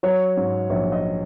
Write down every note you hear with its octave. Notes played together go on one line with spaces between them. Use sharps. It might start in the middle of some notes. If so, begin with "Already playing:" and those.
F#3 C#5
G#2
A#1 C#5
D#5